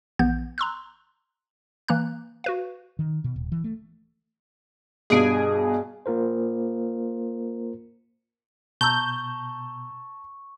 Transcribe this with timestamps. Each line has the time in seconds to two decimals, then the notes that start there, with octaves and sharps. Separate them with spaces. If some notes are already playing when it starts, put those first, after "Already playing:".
0.19 A#1 E3 B3 G6
0.58 A#5 C6 E6 F#6
1.88 E3 A#3 A#5 F#6
2.44 F#4 B4 F5
2.99 D#3
3.24 B2
3.36 D#1
3.52 E3
3.64 A3
5.10 G2 B2 G#4 D7
6.06 A#3 F4 A#4 C5
8.81 B2 A5 A#5 C#6 E6 G6